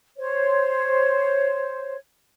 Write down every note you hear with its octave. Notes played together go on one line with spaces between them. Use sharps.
C5 C#5